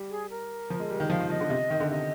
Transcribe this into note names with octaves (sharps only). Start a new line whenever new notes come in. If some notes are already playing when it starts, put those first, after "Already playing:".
Already playing: G3
G#4
A#4
F3
G#3
G3
D#3
F3 F5
D#3
F3 D#5
D3
C3
D#3
D3
C3 D#5